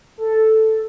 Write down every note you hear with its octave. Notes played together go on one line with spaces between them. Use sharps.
A4